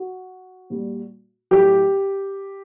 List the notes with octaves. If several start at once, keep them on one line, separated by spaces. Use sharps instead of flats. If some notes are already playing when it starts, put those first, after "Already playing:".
Already playing: F#4
A#2 G3
A2 F#3 G4